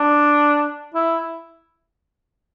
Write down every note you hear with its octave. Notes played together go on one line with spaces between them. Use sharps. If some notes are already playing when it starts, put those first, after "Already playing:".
Already playing: D4
E4